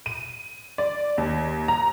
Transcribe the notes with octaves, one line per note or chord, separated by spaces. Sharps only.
D#7
D5
D#2
A#5